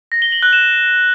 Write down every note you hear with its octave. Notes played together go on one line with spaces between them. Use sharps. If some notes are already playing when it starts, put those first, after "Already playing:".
A#6
G7
F#7
F#6
E7